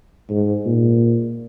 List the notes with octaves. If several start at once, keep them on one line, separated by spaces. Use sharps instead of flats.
G#2
A#2